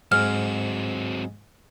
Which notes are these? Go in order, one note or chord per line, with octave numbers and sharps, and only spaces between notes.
G#2 F#3 C4 F6